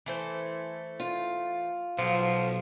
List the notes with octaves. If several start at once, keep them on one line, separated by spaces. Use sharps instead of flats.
E3 A3 C5
F4
B1 F3 A4 F#5